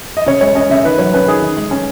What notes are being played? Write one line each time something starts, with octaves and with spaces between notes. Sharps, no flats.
D#5
C#3 C#5
G#3 C#5
C#4 D#5
C#3 E5
D#3 B4
F#3 C#5
C#4 B4
D#3 G#4
D#3
G#3
C#4